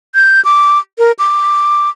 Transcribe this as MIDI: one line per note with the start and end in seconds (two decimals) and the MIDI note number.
0.15 0.43 91
0.45 0.79 86
0.98 1.12 70
1.19 1.89 86